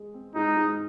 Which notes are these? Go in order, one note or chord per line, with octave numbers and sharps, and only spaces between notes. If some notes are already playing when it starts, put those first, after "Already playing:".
Already playing: G#3
C4
G#2 D#4
G#2